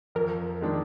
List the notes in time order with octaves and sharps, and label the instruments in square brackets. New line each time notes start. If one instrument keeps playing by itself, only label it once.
[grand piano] F2 [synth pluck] A#4
[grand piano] D#3 G#3 D4